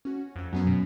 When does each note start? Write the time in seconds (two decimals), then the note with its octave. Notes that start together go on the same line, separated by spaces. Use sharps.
0.05 C#4 F#4
0.36 F2 F#4
0.53 F#2 F#3 B3 C#4
0.67 B2